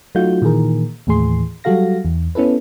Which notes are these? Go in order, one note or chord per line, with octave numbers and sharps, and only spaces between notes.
F#3 A3 D#4 F4 F#4 G6
A#2 D#3 E3 G#4 A#4
D#2 A2 E3 G#4 C6
F#3 G3 F#4 A4 F5 A#6
E2
B3 C#4 E4 A4 B4